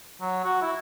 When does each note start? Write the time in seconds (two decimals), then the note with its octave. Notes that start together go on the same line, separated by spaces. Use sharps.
0.21 F#3
0.44 F#4
0.62 E4